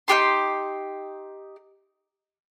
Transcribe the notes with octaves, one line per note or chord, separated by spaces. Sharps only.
D#4 F4 G4 C6